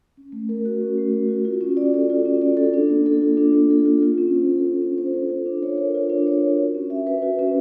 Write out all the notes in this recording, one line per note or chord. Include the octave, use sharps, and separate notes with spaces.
C#4
A3
A#4
F#4
C#4
A3
A#4
F#4
F4
C#4
D5
A4
F4
C#4
D5
A4
D4
A#3
A4
F4
D4
A#3
A4
F4
F4
C#4
C5
A4
F4
C#4
C5
A4
F4
D4
C#5
A#4
F4
D4
C#5
A#4
F#4
C#4
E5
B4
F#4
C#4